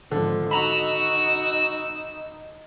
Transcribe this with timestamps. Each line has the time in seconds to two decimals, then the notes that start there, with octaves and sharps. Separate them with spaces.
0.12 G#1 D3 F3
0.51 D#4 F#4 A#5 B5 E6